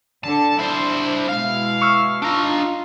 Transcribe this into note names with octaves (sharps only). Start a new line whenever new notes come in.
D3 D4 A4 A5
D4 E4 C5
B2 G#3 E4 F5
C#6 E6 F6
D4 D#4 F4 A#5